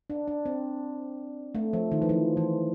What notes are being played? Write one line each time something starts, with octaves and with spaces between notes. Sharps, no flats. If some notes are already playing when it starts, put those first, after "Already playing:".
D4
D4
C4
A3
F3
D#3
E3
F3
E3